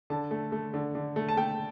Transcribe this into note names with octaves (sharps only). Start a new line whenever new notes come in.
D3 A5
A3
A3
D3
D3
A3
A5
A3 G5